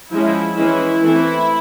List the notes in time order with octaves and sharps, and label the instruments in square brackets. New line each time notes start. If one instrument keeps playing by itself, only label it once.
[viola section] F3 G#3 C#4 E4
E3 G#3 C#4 E4
E3 A3 C4